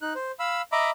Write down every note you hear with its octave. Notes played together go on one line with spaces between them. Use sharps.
D#4 F#6
C5
F5 B5 E6
D#5 E5 A#5 B5 D6